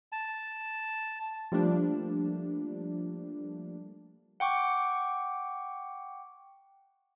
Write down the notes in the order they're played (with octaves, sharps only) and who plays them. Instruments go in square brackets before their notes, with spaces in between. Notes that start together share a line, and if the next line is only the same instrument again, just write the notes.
[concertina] A5
[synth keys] F3 G3 A3 A#3 D4
[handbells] F#5 G5 C#6 D6